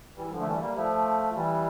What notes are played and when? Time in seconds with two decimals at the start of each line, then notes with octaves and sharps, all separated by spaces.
0.17 E3 G3
0.27 G3
0.31 D3 F3
0.40 A3
0.46 E3 G3
0.61 G3 A#3
0.76 F3 A3
1.35 E3 G3